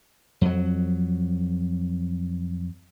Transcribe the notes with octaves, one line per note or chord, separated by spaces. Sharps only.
F2 F#3